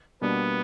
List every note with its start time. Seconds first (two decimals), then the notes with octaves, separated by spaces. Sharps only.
0.21 B2 G3 A#3 B3 D4